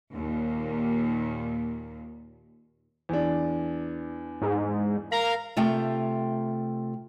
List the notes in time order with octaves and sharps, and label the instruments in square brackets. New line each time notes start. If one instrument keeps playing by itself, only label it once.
[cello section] D#2 A#2
[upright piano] E2 D4
[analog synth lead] G#2
[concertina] A#4 F5 [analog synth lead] A#5
[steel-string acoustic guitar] C3 A3 F4 G5